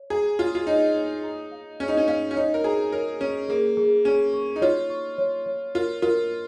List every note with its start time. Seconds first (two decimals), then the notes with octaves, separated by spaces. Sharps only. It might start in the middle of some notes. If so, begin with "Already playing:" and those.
Already playing: C#5
0.10 G#4 A#5
0.39 F4 C#5
0.55 F4
0.67 D#4 C#5
0.96 C#5
1.23 A#5
1.51 F5
1.80 C#4 G#4
1.88 D#4
1.97 C#4
2.08 C#4 F5
2.31 C#4
2.36 D#4 C#5
2.54 A#4
2.64 G#4 A#5
2.92 A#4 C#5
3.21 C#4 C#5
3.48 A#3 G#4
3.77 G#4
4.05 C#4 G#4
4.34 C#6
4.56 D#4
4.61 F4 C#5
4.90 C#6
5.18 C#5
5.46 C#5
5.75 F4 A#4
6.02 F4 A#4
6.31 A#4